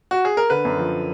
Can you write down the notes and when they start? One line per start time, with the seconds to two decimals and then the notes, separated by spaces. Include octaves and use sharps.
0.11 F#4
0.25 G#4
0.37 A#4
0.50 D3 B4
0.65 F#2
0.78 F3